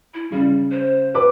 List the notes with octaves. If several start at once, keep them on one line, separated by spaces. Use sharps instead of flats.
E4
C#3 G3
C5
B4 D6